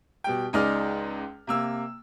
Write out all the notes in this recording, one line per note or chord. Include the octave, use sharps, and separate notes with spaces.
B2 G3 G5
C#2 G#3 D#4 G#4 D5 F6
C3 A#3 E6